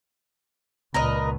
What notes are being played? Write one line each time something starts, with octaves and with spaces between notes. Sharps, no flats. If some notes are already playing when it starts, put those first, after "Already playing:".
C#2 A#2 A#4 B4 D#5